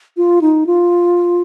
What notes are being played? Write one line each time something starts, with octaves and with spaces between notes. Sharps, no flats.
F4
D#4
F4